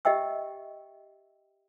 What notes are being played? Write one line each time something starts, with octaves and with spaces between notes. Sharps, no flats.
G4 D#5 E5 G5 E6